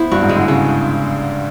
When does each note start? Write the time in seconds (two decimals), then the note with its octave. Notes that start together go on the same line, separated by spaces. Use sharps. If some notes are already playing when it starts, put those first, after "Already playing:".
Already playing: B3 E4 C5
0.11 G2 F#4
0.23 G#2
0.29 G#3
0.36 D3
0.48 C#3 G#3